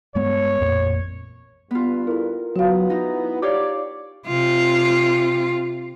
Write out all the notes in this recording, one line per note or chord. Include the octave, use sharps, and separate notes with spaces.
G2 G#3 B3 C#5
A1 F2 A#2
G2 B3 F4
E4 A4 A#4
F#3 B3 F#4 F5
D#4 E4 A#5
G4 C#5 D5 F5 D6
C3 F4